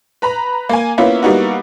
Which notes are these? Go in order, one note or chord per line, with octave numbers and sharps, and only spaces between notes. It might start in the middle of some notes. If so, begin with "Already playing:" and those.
B4 A#5 B5
A#3 G#5
A#3 B3 C#4 E4 F4
G3 A#3 B3 D#4 E4 F#4